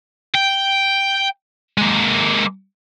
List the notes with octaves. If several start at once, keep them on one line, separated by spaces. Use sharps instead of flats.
G5
G#3 A#3